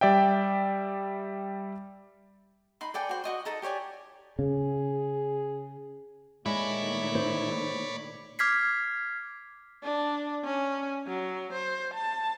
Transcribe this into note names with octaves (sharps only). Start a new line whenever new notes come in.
G3 D5 E5 G5
D#4 B5 C6
A4 D5 G5 G#5
F#4 C5
F#4 D#5 C6
D#4 A4 A#5
G4 C#5 D5 G#5
C#3 G#4
A#2 D#3 G#3 A3 E4 C#5 D5 B5
C5
D6 F6 G#6 B6 C7
D4
C#4
F#3
C5
A5